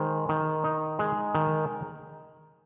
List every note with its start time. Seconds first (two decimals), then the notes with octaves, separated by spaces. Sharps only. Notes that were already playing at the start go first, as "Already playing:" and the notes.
Already playing: D#3 G#3 C5
0.29 D#3
0.64 D#4
0.99 G#3
1.35 D#3